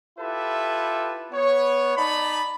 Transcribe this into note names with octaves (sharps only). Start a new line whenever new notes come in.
E4 F4 G4 A4 B4 E5
B3 C#5
D#4 D5 A5 B5